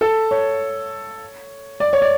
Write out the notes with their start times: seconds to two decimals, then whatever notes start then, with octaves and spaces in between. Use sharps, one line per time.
0.01 A4
0.31 C#5
1.80 D5
1.93 C#5
2.02 D5